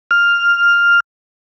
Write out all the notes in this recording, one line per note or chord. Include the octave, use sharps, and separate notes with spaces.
F6